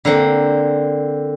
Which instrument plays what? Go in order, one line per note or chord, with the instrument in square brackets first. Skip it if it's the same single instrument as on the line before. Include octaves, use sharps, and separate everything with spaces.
[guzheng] D3 A#3 C4